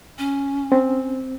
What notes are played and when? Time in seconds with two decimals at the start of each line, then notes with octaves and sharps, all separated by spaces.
0.19 C#4
0.72 C4